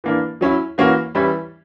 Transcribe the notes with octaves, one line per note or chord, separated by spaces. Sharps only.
E3 A#3 D4
F#3 C#4 E4
E3 A#3 C#4 F#4
E3 G3 C#4 E4